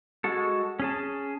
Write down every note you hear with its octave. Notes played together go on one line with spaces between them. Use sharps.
G#3 F#4 A4
C#4 G#4 A5